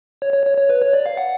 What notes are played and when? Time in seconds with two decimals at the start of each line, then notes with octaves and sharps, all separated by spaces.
0.22 C#5
0.34 C#5
0.46 C#5
0.58 C#5
0.69 B4
0.82 C#5
0.93 D5
1.06 F5
1.17 F#5